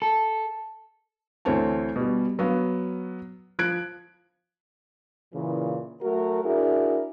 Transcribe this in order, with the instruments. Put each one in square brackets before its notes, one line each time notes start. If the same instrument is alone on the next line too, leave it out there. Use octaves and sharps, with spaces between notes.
[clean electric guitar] A4
[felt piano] D2 E3 C4 C#5 A5
B2 G3
F#3 B3 F5
F3 F#6 G#6 D7
[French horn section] A#2 C#3 E3
F#3 A3 F#4 A#4
D4 E4 F#4 G#4 A#4